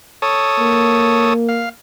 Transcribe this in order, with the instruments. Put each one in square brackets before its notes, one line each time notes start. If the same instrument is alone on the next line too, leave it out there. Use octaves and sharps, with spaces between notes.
[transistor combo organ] A4 C#5 D#6
[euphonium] A#3
[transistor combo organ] F5